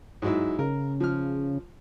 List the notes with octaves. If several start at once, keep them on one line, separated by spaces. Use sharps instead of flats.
G#2 F#3 E4
C#3 A#4
F3 F6